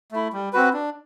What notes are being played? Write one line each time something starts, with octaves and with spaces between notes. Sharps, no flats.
A3 E4
G3
C4 F#4 B4
D4